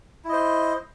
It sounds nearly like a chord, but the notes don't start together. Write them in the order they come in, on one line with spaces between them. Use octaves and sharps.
E4 D#5 C5